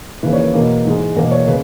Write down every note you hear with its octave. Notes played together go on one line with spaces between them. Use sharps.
D#2 C#3 E3 A#3 B4
C#5
B4
E2 B2 A#3
G#2 E3 G#3
E2 B2 A#3 A#4
C#5
C#3 B4